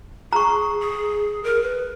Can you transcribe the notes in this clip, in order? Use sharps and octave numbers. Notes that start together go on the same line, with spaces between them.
G#4 A#5 C#6
G#4
A#4
B4